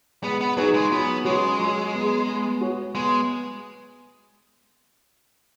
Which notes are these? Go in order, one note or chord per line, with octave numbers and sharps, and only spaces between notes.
G#3 B3
B3
F#3 D#4 G#4 B4
G#3
F#3 B3
G#3 C#4 F#4 C#5
F#3
B3 G#4
B3
F#4 C#5
G#3 B3